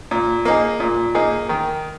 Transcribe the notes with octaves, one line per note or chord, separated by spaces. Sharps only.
A#2
A#3 D#4 G#4
A#2
A#3 D#4 G#4
D#3